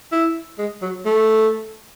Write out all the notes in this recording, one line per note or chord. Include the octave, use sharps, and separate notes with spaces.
E4
G#3
F#3
A3